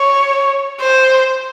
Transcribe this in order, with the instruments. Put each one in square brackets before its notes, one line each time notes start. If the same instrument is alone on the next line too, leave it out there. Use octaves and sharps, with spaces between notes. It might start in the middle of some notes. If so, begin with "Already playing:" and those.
Already playing: [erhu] C#5
C5